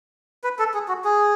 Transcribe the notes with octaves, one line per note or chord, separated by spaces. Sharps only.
B4
A4
G#4
F#4
G#4